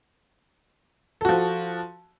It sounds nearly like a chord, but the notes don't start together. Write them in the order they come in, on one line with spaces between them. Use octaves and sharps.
A4 F#4 F3